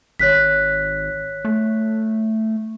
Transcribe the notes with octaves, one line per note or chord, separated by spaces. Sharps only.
G#1 C#5 F#6 B6
A3